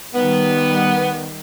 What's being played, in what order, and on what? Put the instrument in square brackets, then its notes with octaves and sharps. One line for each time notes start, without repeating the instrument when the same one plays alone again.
[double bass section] D#3 G3 [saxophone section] B3